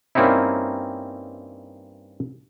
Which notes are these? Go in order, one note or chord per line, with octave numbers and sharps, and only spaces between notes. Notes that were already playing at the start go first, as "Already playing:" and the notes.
G2 A#3 C4 C#4 D#4 E4